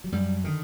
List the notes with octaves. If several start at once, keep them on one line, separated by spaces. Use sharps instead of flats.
F#3
F#2 G3
D3 D#3